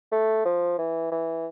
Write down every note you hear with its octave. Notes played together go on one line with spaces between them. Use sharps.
A3
F3
E3
E3